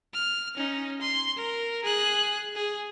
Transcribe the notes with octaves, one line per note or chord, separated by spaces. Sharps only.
F6
C#4 D#4
C6
A#4
G#4 F#6
G#4